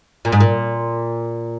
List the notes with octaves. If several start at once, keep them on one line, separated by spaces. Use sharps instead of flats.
A#2
G#2
A#2